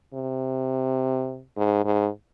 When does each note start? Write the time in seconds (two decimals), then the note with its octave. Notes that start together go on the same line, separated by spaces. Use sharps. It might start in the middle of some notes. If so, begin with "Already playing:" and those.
0.14 C3
1.57 G#2
1.85 G#2